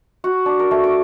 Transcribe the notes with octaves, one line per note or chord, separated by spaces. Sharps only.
F#4
D4
A#4
A3
D6